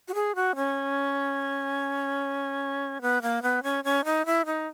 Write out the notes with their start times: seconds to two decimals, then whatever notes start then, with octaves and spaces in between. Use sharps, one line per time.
0.08 F#4
0.14 G#4
0.35 F#4
0.56 C#4
3.02 B3
3.22 A#3
3.42 B3
3.63 C#4
3.84 C#4
4.05 D#4
4.26 E4
4.46 D#4